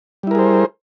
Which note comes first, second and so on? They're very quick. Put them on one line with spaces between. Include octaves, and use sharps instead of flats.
G3 E4 A#4 G#4 C5